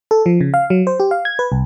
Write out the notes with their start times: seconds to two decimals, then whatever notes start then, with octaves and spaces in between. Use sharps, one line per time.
0.11 A4
0.26 F3
0.41 C#3
0.54 F5
0.70 F#3
0.87 C5
1.00 G4
1.11 F5
1.25 G#6
1.39 B4
1.52 C2